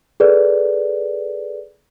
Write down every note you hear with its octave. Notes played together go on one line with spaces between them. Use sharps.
G#4 A4 B4 D5